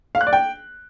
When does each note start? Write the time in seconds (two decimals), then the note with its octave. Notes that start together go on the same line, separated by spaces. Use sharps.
0.15 F5
0.21 F#6
0.27 D5
0.33 G5